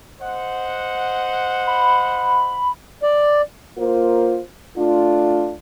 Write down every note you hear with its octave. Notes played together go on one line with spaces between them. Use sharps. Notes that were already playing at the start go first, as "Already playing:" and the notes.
C5 D#5 F#5
B5
D5
A#3 F4 A#4 C5
A3 D4 F4